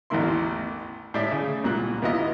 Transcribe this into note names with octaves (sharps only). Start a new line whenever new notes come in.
A1 E2 E3 A#3 E4 C6
A2 D5 E5
C#3
C2 A#2 F#6
D#2 B3 E4 F4 D#5